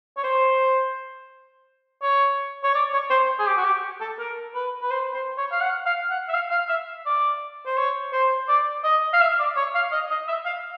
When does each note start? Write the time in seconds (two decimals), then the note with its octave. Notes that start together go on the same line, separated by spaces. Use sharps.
0.17 C#5
0.24 C5
2.03 C#5
2.64 C#5
2.75 D5
2.93 C#5
3.11 C5
3.39 G#4
3.47 G4
3.58 F#4
3.65 G4
4.01 A4
4.19 A#4
4.55 B4
4.82 B4
4.91 C5
5.14 C5
5.38 C#5
5.52 F5
5.61 F#5
5.86 F5
6.10 F#5
6.29 E5
6.34 F5
6.51 F5
6.69 E5
7.06 D5
7.66 C5
7.78 C#5
8.13 C5
8.49 D5
8.84 D#5
9.14 F5
9.21 E5
9.39 D5
9.57 C#5
9.75 F5
9.92 D#5
10.11 D#5
10.28 E5
10.46 F5